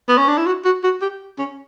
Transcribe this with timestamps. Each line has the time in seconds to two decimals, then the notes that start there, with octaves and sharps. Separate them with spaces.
0.09 B3
0.18 C#4
0.28 D4
0.38 E4
0.46 F#4
0.65 F#4
0.84 F#4
1.02 G4
1.39 C#4